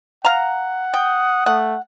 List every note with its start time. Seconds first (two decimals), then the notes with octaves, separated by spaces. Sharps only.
0.25 F5 F#5 A#5
0.94 G5 D#6
1.46 A3 F#5